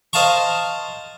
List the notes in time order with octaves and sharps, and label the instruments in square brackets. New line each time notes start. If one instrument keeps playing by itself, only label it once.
[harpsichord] C5 D#5 F5 A5 A#5 C#6